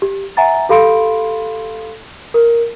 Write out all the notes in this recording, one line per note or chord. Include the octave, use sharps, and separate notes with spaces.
G4
E5 F#5 G#5 A#5 A6
G4 A4 F5 B5 C6 D7
A#4